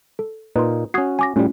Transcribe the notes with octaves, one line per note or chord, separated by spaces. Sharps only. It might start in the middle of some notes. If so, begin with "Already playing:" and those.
A4
A#2 D#4 B4 C6
C#4 F#4 D#6 G#6 C7
G#5 D6 A#6
A2 G3 A3 C#4 F4